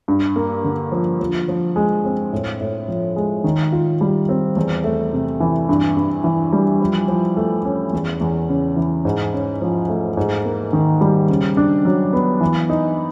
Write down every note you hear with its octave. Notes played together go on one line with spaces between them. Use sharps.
G2
A#3
D3
F3
F3
F3
G#3
C4
A2
A2
F3
G#3
D#3
F4
G3
C4
E2
A3
C3
E3
G2
G2
E3
G3
F3
F3
A3
C#4
E2
E2
C#3
E3
G#2
C#4
F3
A3
G#2
A#3
D#3
G3
C#3
D4
F#3
B3
E3
D#4